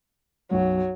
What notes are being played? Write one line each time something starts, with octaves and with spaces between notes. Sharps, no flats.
B1 F#2 F#3